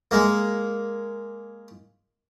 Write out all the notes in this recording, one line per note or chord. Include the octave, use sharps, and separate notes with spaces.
G#3 A#3